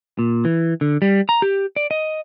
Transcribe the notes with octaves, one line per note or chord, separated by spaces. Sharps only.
A#2
E3
D3
G3
A#5
G4
D5
D#5